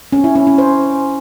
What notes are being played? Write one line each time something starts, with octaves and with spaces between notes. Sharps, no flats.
C#4
E4
C#4
C#4
C5